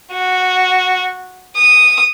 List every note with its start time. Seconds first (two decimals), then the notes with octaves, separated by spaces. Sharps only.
0.12 F#4
1.56 D#6